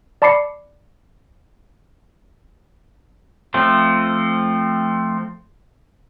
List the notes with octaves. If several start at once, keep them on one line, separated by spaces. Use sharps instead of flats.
D5 A5 B5 D6 C7 C#7
F3 A3 C4